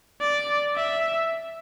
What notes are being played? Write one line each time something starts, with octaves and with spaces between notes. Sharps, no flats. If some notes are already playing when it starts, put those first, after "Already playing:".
D5
E5